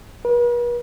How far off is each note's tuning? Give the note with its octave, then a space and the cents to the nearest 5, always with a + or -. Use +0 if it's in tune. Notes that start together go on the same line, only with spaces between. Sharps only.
B4 -45